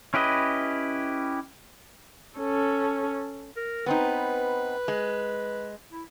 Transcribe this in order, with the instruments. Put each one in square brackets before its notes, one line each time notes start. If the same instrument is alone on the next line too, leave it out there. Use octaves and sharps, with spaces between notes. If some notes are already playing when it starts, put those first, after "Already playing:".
[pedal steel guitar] C#4 E4 G4 B4 D#5
[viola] C#4 A4
[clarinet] A#4
[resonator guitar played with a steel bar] B3 C4 D#4 [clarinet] B4
[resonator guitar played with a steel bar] G#3
[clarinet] E4